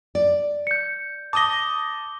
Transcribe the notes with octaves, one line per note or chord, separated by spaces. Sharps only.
D5
G6 C#7
A5 D6 D#6 A#6 G7